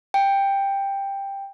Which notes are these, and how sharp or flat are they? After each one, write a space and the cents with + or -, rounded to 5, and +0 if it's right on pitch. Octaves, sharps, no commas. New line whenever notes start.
G5 +10